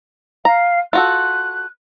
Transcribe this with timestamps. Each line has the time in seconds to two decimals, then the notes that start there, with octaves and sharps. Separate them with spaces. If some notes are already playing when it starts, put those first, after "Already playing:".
0.45 F5 A#5
0.93 F4 F#4 A4 F#6